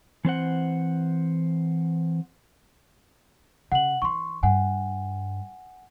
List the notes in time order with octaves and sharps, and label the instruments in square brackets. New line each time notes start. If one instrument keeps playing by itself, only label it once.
[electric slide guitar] E3 C4 C5 F#5
[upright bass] C#3 [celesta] F#5 F#7
[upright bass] E3 D#4 [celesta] C6 C#6
[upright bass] G2 [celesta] F#5 G#5